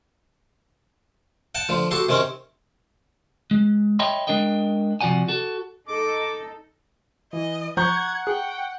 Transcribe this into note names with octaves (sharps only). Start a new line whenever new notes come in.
F#5 G5 A5
D3 F3
F#4 G4 A4 C6
C3 D#3 C4 C#4
G#3
C#5 D#5 E5 G5 B5 C6
G#3 A#3 D4 A#4 D#5 G5
C3 F3 F#4 D5 F#5 G#5
F#4 A4
D#4 A4 D6
E3 D#5
F3 F#5 A#5 C#6 G6 G#6
G#4 G5